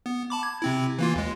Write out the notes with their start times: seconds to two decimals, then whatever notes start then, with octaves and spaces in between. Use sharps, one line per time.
0.06 B3
0.30 A5 B5 D6
0.43 G#6
0.62 C3 C4 E4
0.98 E3 A#3 F4
1.15 D#2 G#3